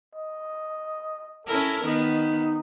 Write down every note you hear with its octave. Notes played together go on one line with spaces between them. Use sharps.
D#5
C#4 E4 A4 A#4
D#3 B3 D#4